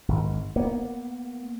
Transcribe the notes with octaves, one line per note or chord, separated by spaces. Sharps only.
G#1
A#3 B3